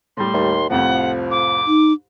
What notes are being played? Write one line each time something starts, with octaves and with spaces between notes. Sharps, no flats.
A2 G3 C6
D#2
C2 F2 A2 F3 F#5
D6
D#4